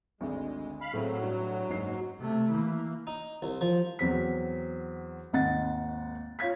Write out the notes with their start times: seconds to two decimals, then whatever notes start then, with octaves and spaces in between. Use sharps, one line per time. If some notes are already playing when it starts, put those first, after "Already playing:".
0.21 G#1 D2 D3 G#3
0.81 F5 B5
0.93 A2 F#3 A3 C4 G#4
1.22 G2
1.70 F#1 G#2 D#4 C7
2.19 C3 A3
2.51 E3 A#3
3.07 D#4
3.42 C2
3.61 F3
3.99 E2 F#3 C4 B6
5.33 G#1 D#2 D#5 F#5 A6
6.39 F4 C#5 F5 G#6 B6